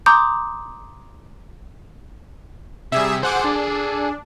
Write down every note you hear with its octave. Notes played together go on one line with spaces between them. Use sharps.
A#5 C6 D6 D#6 G6
C3 G3 G#4 E5
G#4 A4 C5 F#5 D6
D4